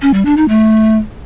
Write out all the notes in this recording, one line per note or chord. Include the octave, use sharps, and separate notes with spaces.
C#4
G3
D4
D#4
A3